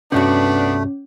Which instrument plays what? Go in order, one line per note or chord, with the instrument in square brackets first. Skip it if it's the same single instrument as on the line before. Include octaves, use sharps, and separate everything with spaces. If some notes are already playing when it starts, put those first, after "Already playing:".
[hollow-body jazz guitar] C2 G2 F#4 [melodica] A3 [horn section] B3 D4 [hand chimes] C#4